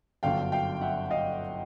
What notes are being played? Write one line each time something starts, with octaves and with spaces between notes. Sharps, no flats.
G1 F#2 D3 F5 G5
F5 G5
E5 F#5
D#5 F5